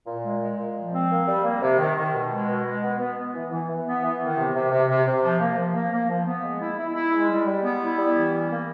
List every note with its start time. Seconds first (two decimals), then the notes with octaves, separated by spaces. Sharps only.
0.07 A#2
0.24 G#3
0.41 G#3
0.59 A#2
0.76 F3
0.94 C4
1.10 A#3
1.28 G3
1.44 A#3
1.62 C3
1.79 D#3
1.96 D#3
2.14 B2
2.30 G#3
2.48 B2
2.65 G#3
2.82 B3
2.99 B3
3.17 B3
3.33 E3
3.51 E3
3.68 E3
3.85 B3
4.03 E3
4.20 D#3
4.36 C3
4.54 C3
4.71 C3
4.88 C3
5.06 C3
5.23 F3
5.40 A#3
5.57 F3
5.75 A#3
5.92 A#3
6.09 F3
6.26 B3
6.43 G#3
6.60 E4
6.78 E4
6.95 E4
7.12 G#3
7.29 G3
7.47 G3
7.64 B3
7.81 E4
7.98 G3
8.16 E3
8.32 C#4
8.50 A#3